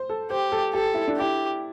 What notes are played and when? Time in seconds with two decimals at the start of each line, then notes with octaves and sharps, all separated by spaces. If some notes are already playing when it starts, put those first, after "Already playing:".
Already playing: C5
0.09 A4
0.30 G4 C5
0.52 A4
0.74 G4 A4
0.95 E4
1.08 D4
1.17 E4 G4